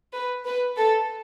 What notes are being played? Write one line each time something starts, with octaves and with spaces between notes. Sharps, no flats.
B4
B4
A4